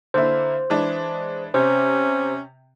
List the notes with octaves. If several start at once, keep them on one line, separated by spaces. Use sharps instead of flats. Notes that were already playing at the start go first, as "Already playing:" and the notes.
D3 A#3 E4 C5
E3 G#3 D4
C3 C#4 C5